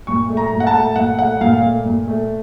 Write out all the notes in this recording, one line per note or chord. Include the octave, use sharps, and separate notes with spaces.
A#2 C#6
A3
A#5
A#2
F#5
A5
A3
A#2 F#5
A3 F#5
A#2 F5
A3
A#2
A3